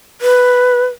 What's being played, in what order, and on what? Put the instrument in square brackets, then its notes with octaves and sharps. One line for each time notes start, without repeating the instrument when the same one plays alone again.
[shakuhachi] B4